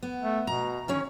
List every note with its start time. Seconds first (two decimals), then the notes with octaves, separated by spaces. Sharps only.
0.03 B3
0.21 A3
0.47 B2 A#5
0.88 D3 D#3 C#4 C#5